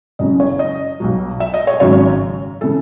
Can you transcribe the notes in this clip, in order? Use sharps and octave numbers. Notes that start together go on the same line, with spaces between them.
F#1 F#2 C#3 D#5
C#5
D#5
B1 B2 F#3
E5
D#5
C#5
G#1 F#2 C#3 F#3 C#5
C#3 E3 A4